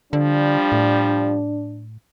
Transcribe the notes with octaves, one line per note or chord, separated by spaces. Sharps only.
D3 F3 G3 D4
A2